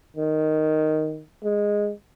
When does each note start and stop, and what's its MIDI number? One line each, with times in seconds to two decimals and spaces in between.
0.16 1.22 51
1.44 1.92 56